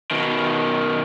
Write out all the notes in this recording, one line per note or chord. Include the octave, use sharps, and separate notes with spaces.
B2 D#3